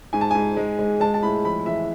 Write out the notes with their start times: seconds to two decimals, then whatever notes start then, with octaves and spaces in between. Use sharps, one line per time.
0.13 G#2 G#5
0.21 A5
0.31 G#2 G#5
0.57 G#3
0.79 G#3
1.00 G#3 A5
1.14 A5
1.23 A2 B5
1.45 F2 B5
1.66 E3 E5